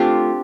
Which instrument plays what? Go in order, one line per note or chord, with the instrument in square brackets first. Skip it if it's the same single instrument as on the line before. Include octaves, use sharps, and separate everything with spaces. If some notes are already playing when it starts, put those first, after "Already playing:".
Already playing: [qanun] A3 C4 D4 F4 G4